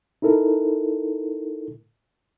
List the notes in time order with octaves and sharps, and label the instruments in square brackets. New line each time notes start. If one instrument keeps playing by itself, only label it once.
[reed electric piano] D#4 E4 A4 A#4